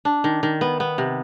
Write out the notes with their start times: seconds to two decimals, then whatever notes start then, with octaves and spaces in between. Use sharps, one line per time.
0.05 D4
0.24 D#3
0.43 D#3
0.61 B3
0.80 B3
0.98 C3